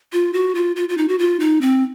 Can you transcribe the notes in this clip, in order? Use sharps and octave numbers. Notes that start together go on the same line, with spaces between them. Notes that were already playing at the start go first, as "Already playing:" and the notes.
F4
F#4
F4
F4
F4
D#4
F#4
F4
D#4
C4